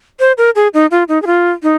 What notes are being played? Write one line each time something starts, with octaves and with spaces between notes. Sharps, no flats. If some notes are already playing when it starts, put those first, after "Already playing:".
C5
A#4
G#4
D#4
F4
D#4
G#4
F4
D#4